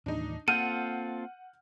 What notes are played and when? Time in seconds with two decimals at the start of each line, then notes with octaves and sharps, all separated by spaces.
0.06 D#2 A2 E3 D4 D#4
0.48 A#3 C4 F4 A4 F#5 F6 G6 D#7